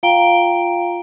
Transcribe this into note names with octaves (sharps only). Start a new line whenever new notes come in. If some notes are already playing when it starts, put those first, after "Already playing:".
F4 F5 G5 A#5 D7 G7